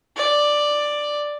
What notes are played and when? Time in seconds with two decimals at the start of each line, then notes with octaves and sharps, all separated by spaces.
0.17 D5